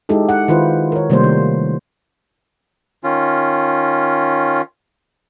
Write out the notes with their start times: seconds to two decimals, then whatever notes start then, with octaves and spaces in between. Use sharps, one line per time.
0.09 G#3 D#4 E4 G4 A4
0.29 F#5
0.48 D#3 E4 F4 B4 C5
0.92 A#4 C#5
1.10 C3 D#3 G3 A3 A#3 C5
1.24 D#3
3.04 D#3 C#4 F4